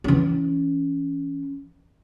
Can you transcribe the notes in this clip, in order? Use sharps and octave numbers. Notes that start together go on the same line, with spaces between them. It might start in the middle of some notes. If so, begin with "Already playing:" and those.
E3 C#4